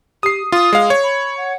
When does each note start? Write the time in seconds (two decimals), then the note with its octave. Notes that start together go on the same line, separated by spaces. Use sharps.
0.23 G4 D#6 C7
0.52 F4 D#6
0.73 G#3 F5
0.90 C#5
1.03 B5
1.37 F#5